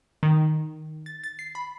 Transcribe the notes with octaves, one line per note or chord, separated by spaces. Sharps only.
D#3
A6
A6
C7
B5